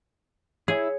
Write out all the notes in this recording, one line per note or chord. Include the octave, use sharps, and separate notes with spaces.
E4 G#4 C#5